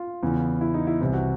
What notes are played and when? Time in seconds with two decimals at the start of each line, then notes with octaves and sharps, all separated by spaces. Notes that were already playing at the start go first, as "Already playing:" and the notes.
Already playing: F4
0.23 E2 C#3 E3
0.61 E4
0.74 D#4
0.87 E4
1.01 C2 C3 E3
1.13 F#4